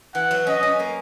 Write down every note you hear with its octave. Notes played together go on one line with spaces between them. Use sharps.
E3 F#5
F#3
C#4 D#5
C#4
A#3